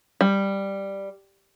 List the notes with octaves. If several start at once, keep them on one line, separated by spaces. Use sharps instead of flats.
G3